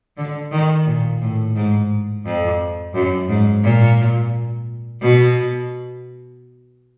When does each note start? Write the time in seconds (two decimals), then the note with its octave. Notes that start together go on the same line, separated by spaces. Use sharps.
0.17 D3
0.52 D#3
0.86 A#2
1.21 A2
1.56 G#2
2.25 F2
2.94 F#2
3.29 G#2
3.63 A#2
5.01 B2